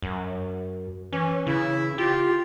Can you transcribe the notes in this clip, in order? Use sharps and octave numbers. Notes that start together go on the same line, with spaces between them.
F#2
E3 C#4
C#3 E4
F4 G4